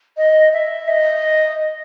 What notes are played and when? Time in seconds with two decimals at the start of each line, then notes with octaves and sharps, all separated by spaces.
0.17 D#5
0.54 E5
0.88 D#5